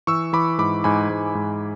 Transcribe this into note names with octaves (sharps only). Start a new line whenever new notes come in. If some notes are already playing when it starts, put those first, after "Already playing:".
E3 C#6 E6
E3 B5 D6
G#2 B5 D6
G#2 G#5 B5
G#2
G#2